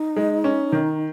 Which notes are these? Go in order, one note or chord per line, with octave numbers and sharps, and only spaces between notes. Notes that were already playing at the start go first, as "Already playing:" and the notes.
Already playing: D#4
G#3
C#4
D#3